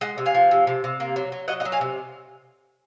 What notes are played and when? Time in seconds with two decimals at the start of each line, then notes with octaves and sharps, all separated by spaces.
0.01 G#3 D#5 F#5
0.18 C3
0.26 F5 G#5
0.35 F3
0.51 C3
0.67 C3
0.84 C3
1.00 A#3
1.16 F#3
1.32 F#3
1.48 F#3 D#5 F#5
1.60 D#5 F#5
1.65 F#3
1.72 F5 G#5
1.81 C3